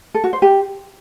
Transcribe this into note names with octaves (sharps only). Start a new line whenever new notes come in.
A4
F#4
C5
G4